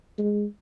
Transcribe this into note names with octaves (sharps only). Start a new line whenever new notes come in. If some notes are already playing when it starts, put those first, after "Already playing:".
G#3